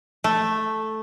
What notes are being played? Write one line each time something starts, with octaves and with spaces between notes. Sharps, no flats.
A3